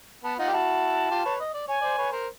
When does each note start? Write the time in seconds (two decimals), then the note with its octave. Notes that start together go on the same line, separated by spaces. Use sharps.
0.24 B3 A5
0.39 D#4 F4 F#5
0.48 G4
0.53 E4 F#4 A5
1.11 F4 G4
1.25 B4 C#5
1.40 D#5
1.54 D5
1.68 C#5 G#5
1.81 C5 D5
1.98 B4 C#5
2.12 A#4 C5